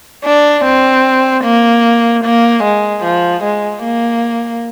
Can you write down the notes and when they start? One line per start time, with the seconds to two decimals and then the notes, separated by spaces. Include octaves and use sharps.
0.25 D4
0.65 C4
1.44 A#3
2.24 A#3
2.64 G#3
3.04 F3
3.44 G#3
3.83 A#3